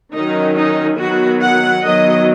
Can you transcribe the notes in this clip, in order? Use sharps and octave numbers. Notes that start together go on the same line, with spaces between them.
D#3 F#3 C#4 D#4
D#4
D#3 F#3 B3 F#4
F#5
D#3 F#3 B3 D#5